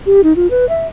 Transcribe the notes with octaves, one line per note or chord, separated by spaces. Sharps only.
G4
D#4
F4
B4
E5